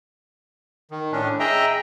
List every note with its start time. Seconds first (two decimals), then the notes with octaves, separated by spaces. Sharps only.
0.91 D#3
1.12 A2 C#4 D4
1.40 G#4 D#5 E5 G5 A#5